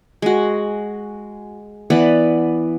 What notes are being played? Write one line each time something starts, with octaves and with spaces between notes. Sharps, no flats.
G#3 F#4
E3 B3 D5